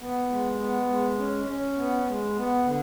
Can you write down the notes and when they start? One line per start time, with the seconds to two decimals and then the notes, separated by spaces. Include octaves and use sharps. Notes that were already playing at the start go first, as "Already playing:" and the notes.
0.01 B3
0.30 G#3
0.59 B3
0.89 G#3
1.18 C#4
1.48 C#4
1.77 B3
2.07 G#3
2.36 B3
2.66 D3